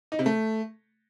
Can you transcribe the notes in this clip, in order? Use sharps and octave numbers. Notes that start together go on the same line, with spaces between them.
D#4
C3
A3